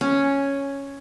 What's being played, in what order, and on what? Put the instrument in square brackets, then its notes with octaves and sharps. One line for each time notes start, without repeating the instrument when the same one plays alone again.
[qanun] C#4